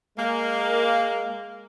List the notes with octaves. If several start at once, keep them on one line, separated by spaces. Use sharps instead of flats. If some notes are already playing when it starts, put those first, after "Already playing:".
G#3 A#3